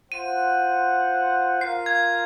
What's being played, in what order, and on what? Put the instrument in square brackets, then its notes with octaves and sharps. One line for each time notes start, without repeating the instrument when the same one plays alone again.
[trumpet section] F4 C5 F#5 [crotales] D#7
[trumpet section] F4 A#4 F5 [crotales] C7
[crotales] G#6